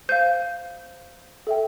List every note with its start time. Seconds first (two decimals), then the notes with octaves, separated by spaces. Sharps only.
0.09 C5 F5 G6
1.47 A4 E5 G5